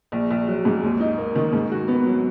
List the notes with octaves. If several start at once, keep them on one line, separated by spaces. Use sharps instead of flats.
A#1
A#1
F#3
G#2
D#2
D#4
A#3
D#3
G#2
F#4
B3
F#3